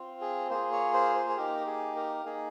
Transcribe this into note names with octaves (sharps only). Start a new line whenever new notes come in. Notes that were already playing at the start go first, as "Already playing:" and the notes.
Already playing: C4 F4
G#4
A#3 F4 G#4 C5
C#5
C5
C5
G#4
A#3 D#4 G4 A#4
G#4
A#4
A#3 D#4 G#4